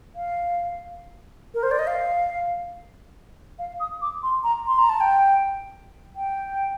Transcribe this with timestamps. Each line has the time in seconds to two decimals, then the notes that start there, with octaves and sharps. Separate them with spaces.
0.15 F5
1.54 A#4
1.63 C5
1.71 D5
1.79 D#5
1.87 F5
3.59 F5
3.80 D#6
4.01 D6
4.23 C6
4.43 A#5
4.67 C6
4.79 A#5
4.89 A5
5.00 G5
6.16 G5